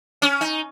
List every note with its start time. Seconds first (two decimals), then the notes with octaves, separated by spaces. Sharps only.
0.22 C#4
0.41 D#4